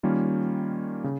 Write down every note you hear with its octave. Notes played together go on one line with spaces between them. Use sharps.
D#3 G3 A#3 C#4 F4
C#3